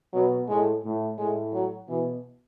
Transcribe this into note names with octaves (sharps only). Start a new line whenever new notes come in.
B2 F#3
A2 G#3
A2
A2 G#3
F#3
B2 E3